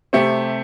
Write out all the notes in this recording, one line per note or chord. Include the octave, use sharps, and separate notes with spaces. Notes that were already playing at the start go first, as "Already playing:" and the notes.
C3 A3 C4 G4